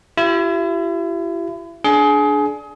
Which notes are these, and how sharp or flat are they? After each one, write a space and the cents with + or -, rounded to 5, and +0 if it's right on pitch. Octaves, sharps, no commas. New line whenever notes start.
E4 +35 G4 -35
D4 +0 G#4 +25